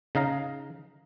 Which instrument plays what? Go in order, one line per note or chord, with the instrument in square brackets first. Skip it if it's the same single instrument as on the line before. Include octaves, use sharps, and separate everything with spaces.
[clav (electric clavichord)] C#3 D#4 F5 A#5